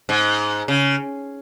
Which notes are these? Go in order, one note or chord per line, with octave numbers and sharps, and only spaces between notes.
G#2
C#3